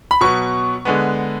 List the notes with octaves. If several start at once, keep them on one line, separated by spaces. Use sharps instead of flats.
B5
B2 F#3 B3 C#6
D3 G#3 B3